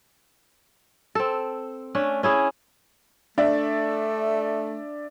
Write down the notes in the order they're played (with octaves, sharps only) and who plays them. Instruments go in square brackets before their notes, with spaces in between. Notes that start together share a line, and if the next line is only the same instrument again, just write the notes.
[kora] C4 A4
A3 C#4 D4
C#4 E4 G#4
[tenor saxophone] A3 [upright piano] D4 D5 E5